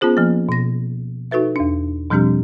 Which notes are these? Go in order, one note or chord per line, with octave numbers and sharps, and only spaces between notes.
B3 C#4 F4 G#4 C5
F3 A#3
B2 A#6
D#4 F#4 A4 B4 E5
E2 D4
B2 F3 G3 C4 D4 G4